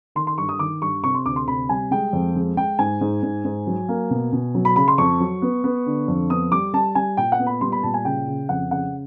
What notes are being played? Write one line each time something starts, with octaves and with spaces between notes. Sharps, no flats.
D#3 C6
C6
G2 C#6
D#6
D#3 D6
G2 C#6
C3 C#6
C6
D2 D6
C6
C3 B5
G3 G#5
G#3 G5
F2
G#3
G#3 G5
G#2 G#5
G#2
G#2
G#2
F#3
A#3
B2
B2
F#3
B5
C#3 B5
C6
F2 C#6
F#3
B3
B3
D3
F2
B3 D#6
G3 D6
G3 A5
G3 G#5
A#2 G5
F#5
B3
B5
G3 C6
B5
A#2 A5
G#5
C#3 G5
C#3
F2 F#5
C#3 F#5